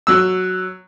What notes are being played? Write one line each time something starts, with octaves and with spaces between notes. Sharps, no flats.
F#3 E6